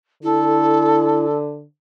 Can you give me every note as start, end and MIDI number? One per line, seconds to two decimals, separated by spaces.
0.23 1.65 50
0.23 1.25 64
0.23 1.37 69